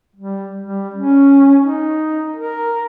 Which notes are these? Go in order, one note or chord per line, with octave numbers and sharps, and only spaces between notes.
G3
G3
C#4
D#4
A#4